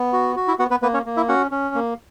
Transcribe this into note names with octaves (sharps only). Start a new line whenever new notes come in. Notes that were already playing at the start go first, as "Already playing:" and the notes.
Already playing: B3
F#4
F#4
E4 E5
B3 F#4 F#5
B3 B4
A#3 B3 B4
C#4 C#5
A#3
E4 E5
C#4 F#4 F#5
C#4
A#3